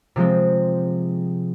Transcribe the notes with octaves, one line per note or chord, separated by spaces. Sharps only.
C3 F3 G#3 C4